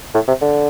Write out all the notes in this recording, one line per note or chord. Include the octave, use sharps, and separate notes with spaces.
A2
C3
D3